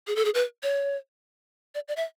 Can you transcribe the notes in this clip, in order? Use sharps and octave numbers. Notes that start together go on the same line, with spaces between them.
G#4
A4
G#4
B4
C#5
D5
D5
E5